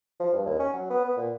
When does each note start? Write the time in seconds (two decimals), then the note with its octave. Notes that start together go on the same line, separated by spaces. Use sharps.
0.20 F3
0.33 G2
0.46 D#2
0.59 C#4
0.73 F#3
0.90 B3
1.05 B3
1.17 A#2